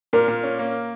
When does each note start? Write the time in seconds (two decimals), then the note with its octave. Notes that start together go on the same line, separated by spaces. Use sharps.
0.13 A#2 A#4
0.28 A#2
0.43 C#4
0.59 A#3